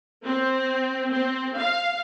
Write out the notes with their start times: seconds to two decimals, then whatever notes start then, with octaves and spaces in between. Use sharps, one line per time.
0.24 C4
1.10 C4
1.56 F5